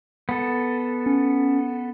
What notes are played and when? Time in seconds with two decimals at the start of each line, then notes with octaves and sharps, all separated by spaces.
0.29 B3 A4
1.06 C#4